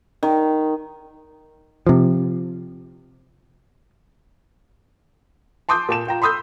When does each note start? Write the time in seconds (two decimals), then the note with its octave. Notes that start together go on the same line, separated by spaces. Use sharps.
0.23 D#3
1.87 C3 F3
5.69 A5 C6 D6 D#6 G6
5.89 A#2 A5 E7
6.07 F4 G5 A#5
6.22 B5 C6 D#6 E6 G6